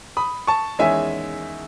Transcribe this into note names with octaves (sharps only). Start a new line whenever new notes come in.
B5 D#6
A5 C#6
E2 D#3 G#3 C#4 E4 E5 G#5